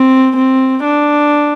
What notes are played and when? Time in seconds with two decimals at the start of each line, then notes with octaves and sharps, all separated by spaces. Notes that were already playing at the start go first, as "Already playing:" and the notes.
Already playing: C4
0.37 C4
0.84 D4